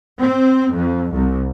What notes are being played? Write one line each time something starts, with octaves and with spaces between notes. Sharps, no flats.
C4
F2
C2